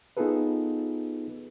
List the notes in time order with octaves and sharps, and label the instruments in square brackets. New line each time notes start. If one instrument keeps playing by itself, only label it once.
[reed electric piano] B3 D#4 F4 G#4 A4 B4